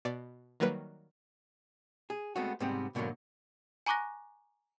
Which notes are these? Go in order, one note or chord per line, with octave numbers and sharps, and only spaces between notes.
B2 D5
D#3 F#3 G3 A#3 B4
G#4
G#3 A3 B3 C4 F#4
G#2 C3 G3 B3 C4
G#2 B2 D3 D#3 F#3 A#3
G#5 A#5 C#6 D6 F#6 A#6